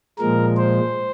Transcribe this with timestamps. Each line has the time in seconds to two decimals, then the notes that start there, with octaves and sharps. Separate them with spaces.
0.19 A#2 F3 G#3 A#4
0.57 C5